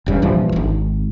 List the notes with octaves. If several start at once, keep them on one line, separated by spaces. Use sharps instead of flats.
E1 G2 C#3
A#1 G2 E3 F3
D1 G#1